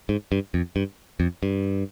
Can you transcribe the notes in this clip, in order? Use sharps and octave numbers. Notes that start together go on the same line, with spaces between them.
G#2
G2
F2
G2
F2
G2